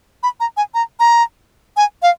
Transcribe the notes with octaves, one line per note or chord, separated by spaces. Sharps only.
B5
A#5
G#5
A#5
A#5
G#5
F5